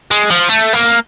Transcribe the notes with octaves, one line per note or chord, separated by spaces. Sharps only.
G#3
F3
A3
A#3